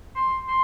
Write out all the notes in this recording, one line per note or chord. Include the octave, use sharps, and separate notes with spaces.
C6
C6